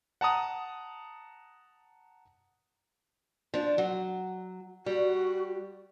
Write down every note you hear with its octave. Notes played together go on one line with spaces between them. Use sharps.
F#5 A5 A#5 D#6
F3 D4
F#3
G3 F#4